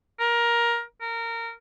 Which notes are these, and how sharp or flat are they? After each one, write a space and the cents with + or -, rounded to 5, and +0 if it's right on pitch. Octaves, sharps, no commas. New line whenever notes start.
A#4 +15
A#4 -20